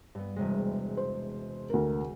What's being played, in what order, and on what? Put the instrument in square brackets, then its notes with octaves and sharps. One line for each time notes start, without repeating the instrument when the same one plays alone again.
[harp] G2 B3
E1 C3 G#3
[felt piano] C5
D2 A#4